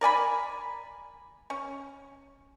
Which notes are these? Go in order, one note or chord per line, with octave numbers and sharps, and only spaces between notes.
A#4 D5 G#5 B5
C#4